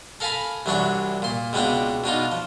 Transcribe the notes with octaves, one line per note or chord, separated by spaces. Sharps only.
A4 A#4 F5 G#5 A5 B5
C2 E3 F#3 D4 D5 C#6
A#2 C6
C#2 B2 B3 C4 D4 G5
B2 D4 D#4 F4
F3